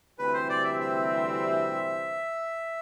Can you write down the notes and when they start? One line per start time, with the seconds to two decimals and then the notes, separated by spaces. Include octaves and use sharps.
0.18 D2 C3 E3 G3 C4 B4
0.34 C5
0.50 D5
0.65 E5
0.80 E5